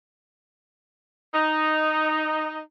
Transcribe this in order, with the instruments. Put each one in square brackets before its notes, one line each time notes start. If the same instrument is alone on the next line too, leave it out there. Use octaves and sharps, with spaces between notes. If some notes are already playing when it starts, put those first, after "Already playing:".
[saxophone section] D#4